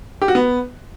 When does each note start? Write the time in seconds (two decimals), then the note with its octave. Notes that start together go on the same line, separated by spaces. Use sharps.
0.22 G4
0.28 F#4
0.35 B3